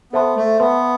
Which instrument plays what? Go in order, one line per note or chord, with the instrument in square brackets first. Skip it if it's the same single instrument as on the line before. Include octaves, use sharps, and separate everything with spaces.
[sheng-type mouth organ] B3 [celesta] A4 C5 E5 A5 C6
[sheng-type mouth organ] A3
[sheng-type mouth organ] B3 [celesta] B4 E5 A5 C6